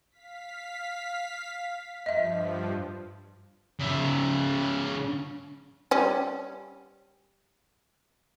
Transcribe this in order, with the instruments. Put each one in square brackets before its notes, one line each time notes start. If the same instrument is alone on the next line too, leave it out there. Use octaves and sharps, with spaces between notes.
[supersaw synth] F5 B6
[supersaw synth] G2 F3 [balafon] D#5 E5
[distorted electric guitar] C#3 E5
[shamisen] G3 C#4